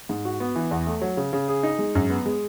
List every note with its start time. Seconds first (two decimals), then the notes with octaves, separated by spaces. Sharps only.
0.09 G#2
0.25 F#4
0.40 B3
0.56 E3
0.71 E2
0.87 A3
1.02 F#3
1.17 C#3
1.33 C#3
1.48 G#4
1.63 D#4
1.79 G#3
1.95 F#2
2.10 B3
2.26 G#3